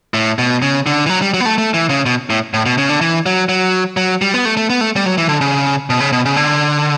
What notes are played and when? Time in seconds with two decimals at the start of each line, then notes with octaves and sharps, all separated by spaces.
0.14 A2
0.39 B2
0.62 C#3
0.86 D3
1.06 E3
1.10 F#3
1.22 G3
1.34 F#3
1.40 B3
1.46 A3
1.58 A3
1.74 E3
1.89 C#3
2.06 B2
2.30 A2
2.54 A2
2.66 B2
2.78 C#3
2.89 D3
3.01 E3
3.26 F#3
3.49 F#3
3.97 F#3
4.22 G3
4.34 B3
4.45 A3
4.57 A3
4.70 B3
4.81 A3
4.96 G3
5.06 F#3
5.18 E3
5.29 D3
5.41 C#3
5.90 B2
6.00 C#3
6.12 B2
6.25 C#3
6.36 D3